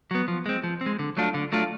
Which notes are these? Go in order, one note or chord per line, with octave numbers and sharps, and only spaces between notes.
F#3 B3
F3
G#3 C4
F3
C4
G#3
D3
F#3 A3 D4 F4
D3
F#3 A3 D4 F4